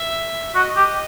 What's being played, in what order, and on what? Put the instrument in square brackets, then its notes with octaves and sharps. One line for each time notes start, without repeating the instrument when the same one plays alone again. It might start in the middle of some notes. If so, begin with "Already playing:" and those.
Already playing: [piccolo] E5
[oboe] F#4 [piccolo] D#5
[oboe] G4